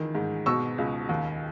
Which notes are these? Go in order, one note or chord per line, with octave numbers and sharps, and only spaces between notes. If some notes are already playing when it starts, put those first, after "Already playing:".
Already playing: C#2 D#3 E3
G#2
B2 C#6 E6
C#2
D#2